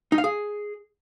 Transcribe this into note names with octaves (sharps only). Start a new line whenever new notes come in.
D#4
F5
G#4